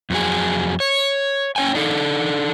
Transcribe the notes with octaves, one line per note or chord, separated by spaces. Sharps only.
F2 F#3 G#4
C#5
C#4 C#5 G5 G#5
D4 D#4 A4